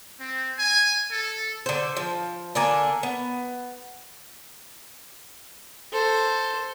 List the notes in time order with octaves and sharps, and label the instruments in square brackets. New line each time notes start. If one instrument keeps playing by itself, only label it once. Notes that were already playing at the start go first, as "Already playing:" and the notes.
[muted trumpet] C4
G#5
A4
[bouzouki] D3 C5
F3
D3 A#3 D4 G#5
B3
[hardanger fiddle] A4 C5